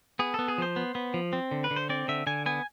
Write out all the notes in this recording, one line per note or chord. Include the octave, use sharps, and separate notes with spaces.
B3 G#4
B3 A4
G#4
F3 C5
B3
B3
F3
C4
D3
B4
D3
C5
C4 D5
D3 E5
D3 G#5
B3 G#5